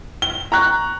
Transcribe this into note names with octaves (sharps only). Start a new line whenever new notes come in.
G7
A#5 C#6 F#6